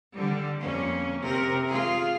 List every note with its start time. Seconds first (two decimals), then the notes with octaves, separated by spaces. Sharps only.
0.12 D3 G3
0.59 F2 A#3 C#4
1.21 C3 A#4
1.67 F4 G#4